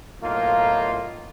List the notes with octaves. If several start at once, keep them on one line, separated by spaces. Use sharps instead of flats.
B1 A2 A#3 D#4 F4